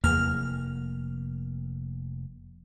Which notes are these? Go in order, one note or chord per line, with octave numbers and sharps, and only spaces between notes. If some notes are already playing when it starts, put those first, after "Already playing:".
F1 E2 A#3 F6